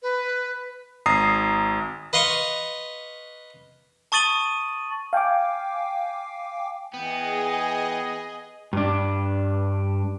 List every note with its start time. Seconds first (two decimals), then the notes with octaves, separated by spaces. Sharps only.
0.02 B4
1.06 G#1 A#5 D#6 C7
2.13 B4 D#5 F5 C6 C#6
4.12 A5 C#6 D#6 A6 D#7 F#7
5.13 F5 G5 G#5 D6
6.94 E3 B3 G#4 D#5 G5
8.73 G2 D4